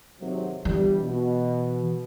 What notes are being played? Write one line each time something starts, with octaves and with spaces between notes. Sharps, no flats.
G#1 C3 F#3
G1 E3 G3
B2